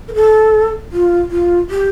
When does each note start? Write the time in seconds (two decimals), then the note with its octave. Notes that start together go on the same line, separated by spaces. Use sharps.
0.08 A#4
0.14 A4
0.92 F4
1.31 F4
1.70 G4